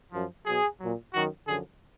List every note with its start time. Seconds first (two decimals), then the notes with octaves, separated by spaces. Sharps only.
0.13 F#2 F3
0.46 B2 F#3 G#4
0.80 A#2 F#3
1.13 F#2 D#3 F#3 F#4
1.47 F#2 D3 F3 G#4